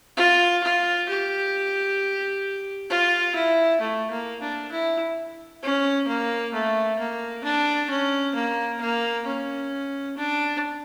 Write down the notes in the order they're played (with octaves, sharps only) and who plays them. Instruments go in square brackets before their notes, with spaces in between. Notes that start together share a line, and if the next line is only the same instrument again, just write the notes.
[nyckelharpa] F4
F4
G4
F4
E4
A3
A#3
D4
E4
C#4
A#3
A3
A#3
D4
C#4
A#3
A#3
C#4
D4